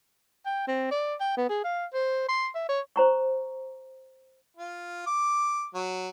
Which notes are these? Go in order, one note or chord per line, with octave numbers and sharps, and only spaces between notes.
G5
C4
D5
G5
B3
G#4
F5
C5
C6
E5
C#5
C5 A#5 C#6
F4
D6
F#3